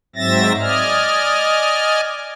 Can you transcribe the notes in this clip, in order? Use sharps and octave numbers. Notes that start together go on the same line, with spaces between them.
G#2 F#3 C4 E5 A6 A#6
D5 D#5 G#5 F6